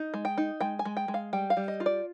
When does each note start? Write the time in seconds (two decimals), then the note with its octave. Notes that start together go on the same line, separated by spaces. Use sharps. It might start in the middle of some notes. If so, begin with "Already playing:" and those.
Already playing: D#4
0.14 G#3
0.25 G5
0.38 D#4
0.61 G#3 G5
0.79 G#5
0.85 G#3
0.97 G5
1.08 G#3
1.14 F5
1.33 G3 G5
1.50 F5
1.57 G3
1.68 D#5
1.80 F4
1.86 D5